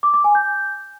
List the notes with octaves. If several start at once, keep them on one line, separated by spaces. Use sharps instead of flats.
D6
D6
G#5
G6